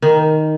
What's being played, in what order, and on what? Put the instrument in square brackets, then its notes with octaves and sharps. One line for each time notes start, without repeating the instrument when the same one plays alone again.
[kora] D#3